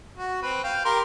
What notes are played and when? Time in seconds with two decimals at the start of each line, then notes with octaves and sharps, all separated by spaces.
0.18 F#4
0.43 C4 B4
0.64 F5 G5
0.85 G4 A#4 C6